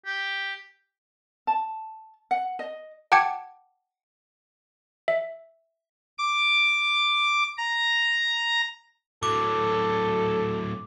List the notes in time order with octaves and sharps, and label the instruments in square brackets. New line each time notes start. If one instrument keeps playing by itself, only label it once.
[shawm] G4
[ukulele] A5
F#5
D#5
[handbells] F#5 G5 A5 D6 G#6 C#7
E5
[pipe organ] D6
A#5
[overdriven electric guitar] A2 F#3 [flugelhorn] A4 [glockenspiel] D6